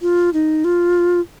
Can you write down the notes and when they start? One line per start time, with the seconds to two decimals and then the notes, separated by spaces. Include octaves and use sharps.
0.02 F4
0.33 D#4
0.64 F4